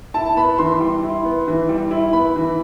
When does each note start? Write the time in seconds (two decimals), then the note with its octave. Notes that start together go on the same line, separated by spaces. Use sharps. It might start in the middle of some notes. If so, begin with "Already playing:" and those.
0.14 E4 A5
0.37 B3 B5
0.58 E3 C6
0.80 G3
1.03 E4
1.25 B3
1.47 E3
1.69 G3
1.91 E4
2.13 B3 B5
2.36 E3